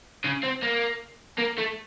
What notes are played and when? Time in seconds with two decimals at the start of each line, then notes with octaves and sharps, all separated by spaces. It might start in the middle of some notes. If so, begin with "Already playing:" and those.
0.24 C#3
0.43 C4
0.62 A#3
1.38 A#3
1.58 A3